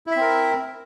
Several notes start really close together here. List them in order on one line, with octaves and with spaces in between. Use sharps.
E4 E5 C4 A#4